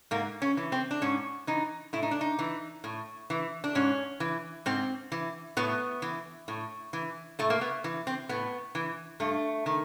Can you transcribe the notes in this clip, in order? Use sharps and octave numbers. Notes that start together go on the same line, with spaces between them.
G#2 A#3
C#4
E3
C4
D4
G#2 C#4
E3 D#4
A2 E4
D#4
D4
D#4
E3
A2
E3
D4
G#2 C#4
E3
G#2 C4
E3
A2 B3
E3
A2
E3
A2 A3
A#3
B3
E3
C4
A2 B3
E3
G2 A3
D#3